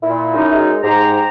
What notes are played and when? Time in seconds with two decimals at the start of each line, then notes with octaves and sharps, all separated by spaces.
0.03 A#2 E4
0.34 F#2 D#4
0.53 G#3
0.83 G#2 G4 C5 A#5